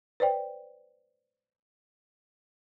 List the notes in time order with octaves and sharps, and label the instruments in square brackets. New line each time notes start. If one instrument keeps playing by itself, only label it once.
[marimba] B4 C5 D5 G5